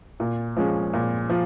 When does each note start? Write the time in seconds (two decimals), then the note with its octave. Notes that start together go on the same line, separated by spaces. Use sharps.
0.20 A#2
0.57 F3 G#3 C#4
0.93 A#2
1.29 F3